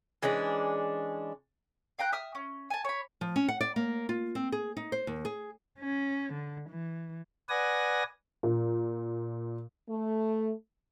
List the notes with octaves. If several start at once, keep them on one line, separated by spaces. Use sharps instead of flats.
E3 G#3 C#4 D4
F5 G5 A#5 F#6
E5 D#6 F6
C#4
G#5 A5
C#5 B5
F3
C#4
F#5
D5
A#3
F4
C4
G#4
D#4
C5
D#2
G#4
C#4
D3
E3
B4 D5 F#5 G#5 D#6 A#6
A#2
A3